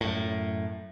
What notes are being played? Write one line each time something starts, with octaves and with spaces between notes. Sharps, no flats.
F#2 A2